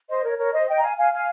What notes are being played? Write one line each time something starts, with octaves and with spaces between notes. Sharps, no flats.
C5 D#5
A#4 C#5
A#4 C#5
C5 D#5
D#5 G5
A#5
F5 G#5
F5 G#5
F5 G#5